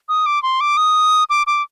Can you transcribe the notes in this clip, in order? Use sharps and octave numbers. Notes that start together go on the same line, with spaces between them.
D#6
D6
C6
D6
D#6
D6
D6